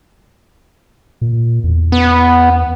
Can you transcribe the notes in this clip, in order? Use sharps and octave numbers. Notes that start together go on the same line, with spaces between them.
A#2
E2
B3